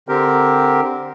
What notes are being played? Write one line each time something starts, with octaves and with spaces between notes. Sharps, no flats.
D3 C4 G4 A#4